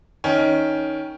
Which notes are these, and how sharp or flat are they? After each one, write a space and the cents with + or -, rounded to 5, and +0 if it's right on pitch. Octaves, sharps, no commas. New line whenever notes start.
D#3 +10 C#4 +10